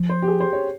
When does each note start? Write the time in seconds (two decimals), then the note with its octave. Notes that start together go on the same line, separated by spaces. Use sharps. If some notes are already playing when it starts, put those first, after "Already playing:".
Already playing: F3
0.09 C5
0.22 G4
0.28 G#4
0.40 C5
0.53 C#5